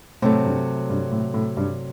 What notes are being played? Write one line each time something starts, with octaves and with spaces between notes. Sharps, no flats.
A2 C3 F#3 A3
G2
G2
A2
A2
G2